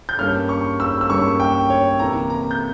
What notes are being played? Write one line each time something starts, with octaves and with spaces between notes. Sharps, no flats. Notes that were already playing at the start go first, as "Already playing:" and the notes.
G6
G2 G3 A#3 C#4 F6
C#6
E6
E6
G2 G3 A#3 C#4 C#6
G5
C#5
C3 E3 A#3 A#5
A#5
G6